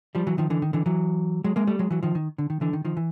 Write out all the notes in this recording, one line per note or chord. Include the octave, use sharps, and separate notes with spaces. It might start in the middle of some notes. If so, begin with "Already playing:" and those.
F3 G3
E3 F#3
D#3 F3
D3 E3
D#3
D3 E3
E3 F#3
F#3 G#3
G#3 A#3
G3 A3
F#3 G#3
E3 F#3
D#3 F3
D#3
D3
D#3
D3 E3
D#3
D#3 F3
E3